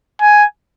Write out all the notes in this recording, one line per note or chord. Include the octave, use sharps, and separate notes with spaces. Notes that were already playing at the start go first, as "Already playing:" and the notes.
G#5